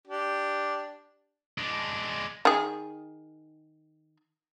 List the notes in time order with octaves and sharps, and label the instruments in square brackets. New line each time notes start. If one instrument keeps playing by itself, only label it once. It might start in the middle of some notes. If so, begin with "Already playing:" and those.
[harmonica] D4 G4
[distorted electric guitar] G#3 D4
[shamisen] D#3 G#4